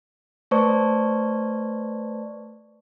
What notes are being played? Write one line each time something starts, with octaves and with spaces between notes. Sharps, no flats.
A3 B4 C5 D5 A5 C#6